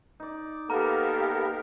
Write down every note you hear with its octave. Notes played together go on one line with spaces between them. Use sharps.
D#4 D5
A#3 B3 G4 A4 A#4 F5 A#5